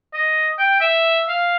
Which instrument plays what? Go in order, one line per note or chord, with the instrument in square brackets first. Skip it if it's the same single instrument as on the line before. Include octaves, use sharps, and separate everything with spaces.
[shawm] D#5
G5
E5
F5